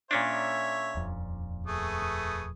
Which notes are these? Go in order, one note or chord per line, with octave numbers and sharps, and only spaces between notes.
A#2 C#4 D4 A4 C#5 E5
D#1 F2
A3 G#4 B4 C#6 D#6